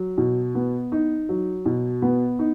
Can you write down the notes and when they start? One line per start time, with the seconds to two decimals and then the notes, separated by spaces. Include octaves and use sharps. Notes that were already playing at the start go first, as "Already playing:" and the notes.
Already playing: F#3
0.18 B2
0.55 B3
0.92 D#4
1.29 F#3
1.66 B2
2.02 B3
2.39 D#4